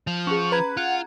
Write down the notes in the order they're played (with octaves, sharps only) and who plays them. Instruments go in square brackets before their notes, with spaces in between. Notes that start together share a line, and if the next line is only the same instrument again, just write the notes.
[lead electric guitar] F3
[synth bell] C#4 G#4 [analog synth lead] C#6
[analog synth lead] B4 [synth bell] A#5 G#6
[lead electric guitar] F4 [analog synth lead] F#5